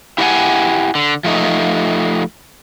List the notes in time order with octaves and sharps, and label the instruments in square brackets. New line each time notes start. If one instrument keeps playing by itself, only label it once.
[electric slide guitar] E4 G4 D#5 F#5 G#5
D3
F3 A3 D#4